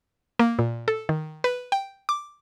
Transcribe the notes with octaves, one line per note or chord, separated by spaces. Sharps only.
A#3
A#2
A4
D#3
B4
G5
D6